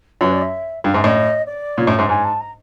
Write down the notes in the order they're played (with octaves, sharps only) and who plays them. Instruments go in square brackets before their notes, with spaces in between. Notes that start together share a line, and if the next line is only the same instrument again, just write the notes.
[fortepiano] F#2 [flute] B4
[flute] D5
E5
[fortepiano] G2 [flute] F5
[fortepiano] G#2 [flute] E5
[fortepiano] A2 [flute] D#5
[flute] D5
[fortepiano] A#2 [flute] C#5
[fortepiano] A2 [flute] D5
[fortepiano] G#2 [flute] E5
[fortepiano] G#2 [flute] G#5
[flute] A5
A#5